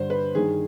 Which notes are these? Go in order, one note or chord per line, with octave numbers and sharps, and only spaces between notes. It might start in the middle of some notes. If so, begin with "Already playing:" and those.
Already playing: G2 D3 C5
B4
G2 D#3 G#4